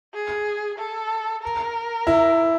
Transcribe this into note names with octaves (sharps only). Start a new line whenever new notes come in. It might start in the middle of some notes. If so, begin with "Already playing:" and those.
G#4
A4
A#4
E4